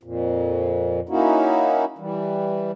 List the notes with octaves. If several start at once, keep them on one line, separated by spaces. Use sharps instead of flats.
F2 A#2
A#3 C#4 D#4 E4 F#4
E3 G3